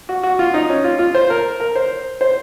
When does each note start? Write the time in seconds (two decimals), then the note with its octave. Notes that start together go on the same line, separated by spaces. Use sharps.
0.09 F#4
0.23 F#4
0.39 F4
0.54 D#4
0.69 C#4
0.84 F4
0.99 F4
1.15 C5
1.30 A#4
1.60 A#4
1.75 C5
2.21 C5